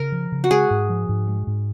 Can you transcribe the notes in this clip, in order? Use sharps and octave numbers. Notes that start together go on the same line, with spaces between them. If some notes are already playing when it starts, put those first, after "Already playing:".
Already playing: C#3 A#4
F3
C#3
F#4
G#3 G#4
G#2
F3
G#2
G#3
G#2